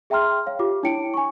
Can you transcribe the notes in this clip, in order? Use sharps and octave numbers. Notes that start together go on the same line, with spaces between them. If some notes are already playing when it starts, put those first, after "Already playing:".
G#4 E5 G5 A#5 C6 F6
C#5 F5
F4 G4 D6
D4 E4 C#5 G5 C#7 D7
G#5 C#6